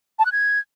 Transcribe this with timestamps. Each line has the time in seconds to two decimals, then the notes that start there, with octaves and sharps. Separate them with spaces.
0.19 A5
0.26 F#6
0.32 G#6